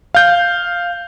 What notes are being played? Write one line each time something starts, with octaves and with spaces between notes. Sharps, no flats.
F5 G6